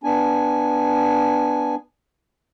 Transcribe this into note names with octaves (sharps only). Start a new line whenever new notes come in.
B3 D4 G#5